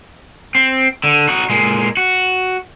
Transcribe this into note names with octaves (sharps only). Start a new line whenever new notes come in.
C4
D3
D#4 F#4
A#2 G#3
F#4